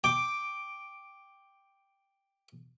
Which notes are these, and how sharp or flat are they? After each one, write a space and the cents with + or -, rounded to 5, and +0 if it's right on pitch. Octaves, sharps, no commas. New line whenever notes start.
G5 +5 D6 +0